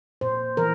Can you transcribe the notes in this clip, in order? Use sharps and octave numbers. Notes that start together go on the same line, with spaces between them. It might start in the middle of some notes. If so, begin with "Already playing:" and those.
A#2 C5
E3 A#4